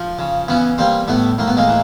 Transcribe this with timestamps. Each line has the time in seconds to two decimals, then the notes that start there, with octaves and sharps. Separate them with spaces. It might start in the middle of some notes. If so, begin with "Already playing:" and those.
Already playing: F3
0.19 C#3
0.48 E3 B3 C#4
0.78 G3 A#3 C4
1.08 A2 A3 B3
1.38 A2 A#3
1.48 B3
1.57 G#3 A#3
1.68 E3